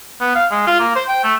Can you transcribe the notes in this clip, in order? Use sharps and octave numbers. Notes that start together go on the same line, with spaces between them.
B3
F5
G#3
F4
A#3
C5
G5
A3